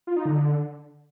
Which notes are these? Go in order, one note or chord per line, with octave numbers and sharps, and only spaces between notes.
F4
D#4
D3